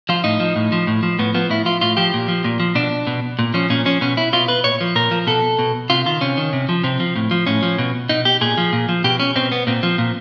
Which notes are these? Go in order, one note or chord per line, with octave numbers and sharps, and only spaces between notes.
F3 F4
A2 D#4
F3
A2
F3
A2
F3
A2 B3
F3 B3
A2 E4
F3 F4
A2 F4
F3 G4
A#2
F3
A#2
F3
B2 D4
B2
A#2
F3 C#4
A#2 C#4
F3 C#4
B2 C#4
E4
B2 F4
B4
A#2 C#5
F3
A#2 A#4
F3
B2 A4
B2
C3 F4
D#3 F4
C3 C#4
D#3
C3
F3
C3 C4
F3
A2
F3
A2 C#4
F3
B2
B2 D#4
G4
A#2 G#4
F3
A#2
F3
B2 G4
C#4
B2 C4
B3
A#2 C4
F3
A#2